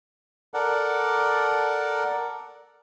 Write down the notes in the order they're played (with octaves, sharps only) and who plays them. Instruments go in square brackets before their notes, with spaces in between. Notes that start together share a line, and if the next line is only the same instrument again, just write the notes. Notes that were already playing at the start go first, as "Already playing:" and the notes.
[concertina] A4 A#4 D5 F#5